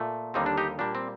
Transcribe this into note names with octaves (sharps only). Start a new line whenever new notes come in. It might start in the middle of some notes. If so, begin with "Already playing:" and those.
Already playing: A#2 A3
D#2 D3 G3 A#3 C4 D#4
D4
D#4 G4
A#2 G3 A#3 D4
C4